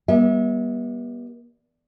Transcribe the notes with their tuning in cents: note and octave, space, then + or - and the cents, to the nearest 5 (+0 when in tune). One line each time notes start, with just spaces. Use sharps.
G3 +0 B3 -40 E5 -35